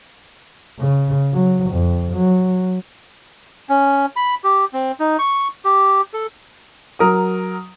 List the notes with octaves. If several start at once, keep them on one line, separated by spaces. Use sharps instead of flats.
C#3
F#3
F2
F#3
C#4
B5
G4
C4
D#4
C#6
G4
A4
F#3 A#4 D#6